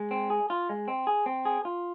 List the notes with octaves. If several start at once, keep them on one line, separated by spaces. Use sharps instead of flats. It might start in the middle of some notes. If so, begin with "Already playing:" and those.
Already playing: G#3
C4
G#4
F4
G#3
C4
G#4
C4
G#4
F4